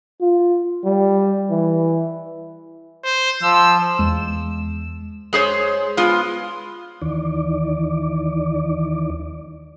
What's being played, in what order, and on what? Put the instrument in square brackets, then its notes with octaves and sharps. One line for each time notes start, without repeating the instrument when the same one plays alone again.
[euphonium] F4
G3
E3
[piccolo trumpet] C5
[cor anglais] F3 [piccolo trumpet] E6
[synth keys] E2 G#3 E7
[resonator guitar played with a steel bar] G#3 G#4 C5 C#5
G#3 B3 F4
[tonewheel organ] D#2 D#3 E3 D5